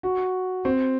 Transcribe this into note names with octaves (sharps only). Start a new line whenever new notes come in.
F#4
C4